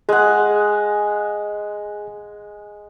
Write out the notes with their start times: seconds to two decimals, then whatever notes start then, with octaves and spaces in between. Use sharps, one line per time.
0.09 G#3 G#4 F#5